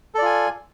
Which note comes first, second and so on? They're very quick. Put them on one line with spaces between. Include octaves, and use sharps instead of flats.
A4 D5 F4 G#5